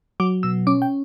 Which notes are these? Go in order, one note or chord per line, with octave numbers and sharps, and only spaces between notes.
F#3 D6
B2 E6
C#4 D6
G5